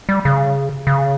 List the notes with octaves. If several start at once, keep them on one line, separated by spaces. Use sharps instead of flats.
G3
C#3
C#3